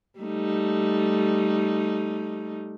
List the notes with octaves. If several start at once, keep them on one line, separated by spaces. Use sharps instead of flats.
G3 A3 D#4